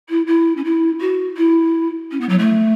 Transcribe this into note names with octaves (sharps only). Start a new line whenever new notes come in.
E4
E4
C#4
E4
F#4
E4
C#4
B3
F#3
A3